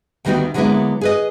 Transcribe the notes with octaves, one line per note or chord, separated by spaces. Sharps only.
D2 D#3 G3 B3 D#4 F#4
D3 F#3 G#3 A#3 B3 E4
G#4 B4 D#5